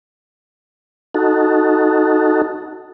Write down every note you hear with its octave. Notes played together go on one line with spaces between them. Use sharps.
D#4 F#4 A4